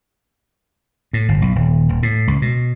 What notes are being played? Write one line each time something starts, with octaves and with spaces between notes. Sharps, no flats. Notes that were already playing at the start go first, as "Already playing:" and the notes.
A2
G1
B1
D#1
D#1
A2
C#2
B2